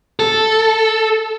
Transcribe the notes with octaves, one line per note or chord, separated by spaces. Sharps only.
A4